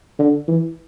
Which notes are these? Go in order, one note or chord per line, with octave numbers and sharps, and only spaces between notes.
D3
E3